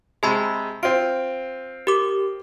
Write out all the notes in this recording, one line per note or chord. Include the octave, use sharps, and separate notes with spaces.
C3 G#3 G#4 A5 B5
C4 F4 D7
G4 A#4 D6